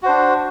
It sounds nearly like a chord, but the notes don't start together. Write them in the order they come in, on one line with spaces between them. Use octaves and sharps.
F#4 C5 D4